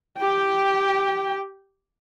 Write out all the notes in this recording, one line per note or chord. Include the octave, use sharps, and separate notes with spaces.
G4 G5